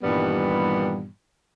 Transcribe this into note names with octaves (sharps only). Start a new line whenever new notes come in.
G2 A#2 D#3 E3 G3 B3